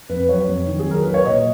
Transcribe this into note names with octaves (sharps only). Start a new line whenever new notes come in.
F2 B4
F#3 C#5
F2
D#3
G#4
F#3 A#4
F#3 B4
C#5
A#2 D#5